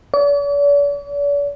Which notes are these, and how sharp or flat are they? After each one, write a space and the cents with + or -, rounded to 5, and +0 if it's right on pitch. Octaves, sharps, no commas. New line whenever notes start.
D5 -45